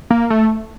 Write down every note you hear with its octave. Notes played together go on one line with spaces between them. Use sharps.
A#3
A3